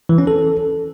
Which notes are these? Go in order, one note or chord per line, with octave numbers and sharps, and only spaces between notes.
E3
C#4
A4